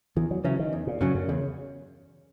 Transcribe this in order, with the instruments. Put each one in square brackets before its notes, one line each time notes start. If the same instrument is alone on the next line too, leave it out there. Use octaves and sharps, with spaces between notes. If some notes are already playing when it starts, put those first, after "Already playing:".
[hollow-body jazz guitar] E2 [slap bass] E3
[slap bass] F#3
[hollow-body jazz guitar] C#3 F#3 C#4 [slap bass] E3
[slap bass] D#3
[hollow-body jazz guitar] E2
[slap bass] A#2
[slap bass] F#2 [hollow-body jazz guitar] C#3 F#3 C#4
[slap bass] F#2
[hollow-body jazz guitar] E2 [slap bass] C#3